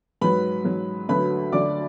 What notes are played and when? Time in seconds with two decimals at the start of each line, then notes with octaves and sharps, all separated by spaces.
0.21 G#2 F#3 B4 B5
0.64 G#2 F#3
1.09 D2 D3 F#3 B4 B5
1.52 D2 D3 F#3 D5 D6